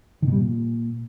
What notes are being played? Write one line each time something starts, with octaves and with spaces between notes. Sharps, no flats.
D#3
B2
G3
A#2